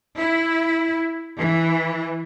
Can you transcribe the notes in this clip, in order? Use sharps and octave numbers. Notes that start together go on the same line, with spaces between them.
E4
E3